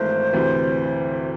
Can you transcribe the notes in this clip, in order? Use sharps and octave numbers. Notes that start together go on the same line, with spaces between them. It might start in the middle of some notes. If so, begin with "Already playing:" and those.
Already playing: G#1 G#2 E3 A3 E4 C5
D2 C3 E3